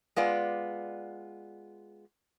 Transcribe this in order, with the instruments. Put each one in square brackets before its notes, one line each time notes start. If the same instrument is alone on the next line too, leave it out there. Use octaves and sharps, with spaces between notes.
[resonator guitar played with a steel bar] G#3 B3 F4 D5